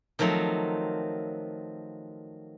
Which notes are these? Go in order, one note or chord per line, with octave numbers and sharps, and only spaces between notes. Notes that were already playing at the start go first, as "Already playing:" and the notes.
D#3 F3 F#3 A3 C4